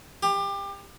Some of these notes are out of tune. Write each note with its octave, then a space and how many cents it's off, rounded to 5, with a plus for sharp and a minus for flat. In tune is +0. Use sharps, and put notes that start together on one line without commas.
G4 +25